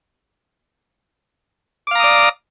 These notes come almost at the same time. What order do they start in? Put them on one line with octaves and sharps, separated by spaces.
D6 F5 A#5 D#6 D5